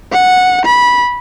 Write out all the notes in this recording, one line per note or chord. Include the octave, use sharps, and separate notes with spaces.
F#5
B5